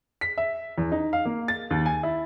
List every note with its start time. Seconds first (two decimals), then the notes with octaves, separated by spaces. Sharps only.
0.21 B6
0.38 E5
0.78 E2
0.92 D#4
1.13 F5
1.25 A#3
1.48 A6
1.71 D#2
1.86 G#5
2.03 E4